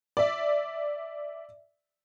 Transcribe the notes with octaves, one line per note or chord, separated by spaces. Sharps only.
D5 E5